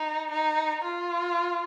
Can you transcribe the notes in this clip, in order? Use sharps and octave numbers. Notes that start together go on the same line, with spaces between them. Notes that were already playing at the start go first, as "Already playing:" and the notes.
Already playing: D#4
D#4
F4